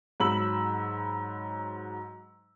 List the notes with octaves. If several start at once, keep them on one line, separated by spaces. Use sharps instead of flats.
G#2 F#3 B5 E6 F#7